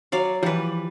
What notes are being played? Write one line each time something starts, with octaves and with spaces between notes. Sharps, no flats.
F#3 D5 F5
E3 F3 G3 B4